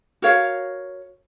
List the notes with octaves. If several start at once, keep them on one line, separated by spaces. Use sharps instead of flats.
F#4 A#4 C#5 F5